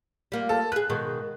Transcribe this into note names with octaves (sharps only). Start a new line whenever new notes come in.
G3 A#3 F4
A4
G#4 B4 F#6
B2 D#3 G#3